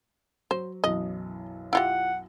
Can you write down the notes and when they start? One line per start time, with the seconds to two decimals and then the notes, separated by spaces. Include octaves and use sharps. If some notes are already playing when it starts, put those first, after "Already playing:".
0.51 F#3 C5
0.84 B1 F#2 E3 D#5
1.73 E4 F4 G4 F#5